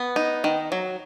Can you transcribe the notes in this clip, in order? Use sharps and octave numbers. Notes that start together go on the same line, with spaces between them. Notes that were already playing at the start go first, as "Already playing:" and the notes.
Already playing: B3
D#4
D#3
F#3